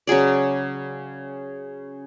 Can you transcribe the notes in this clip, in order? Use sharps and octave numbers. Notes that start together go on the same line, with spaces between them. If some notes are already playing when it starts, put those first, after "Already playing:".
C#3 F#3 G#4 D5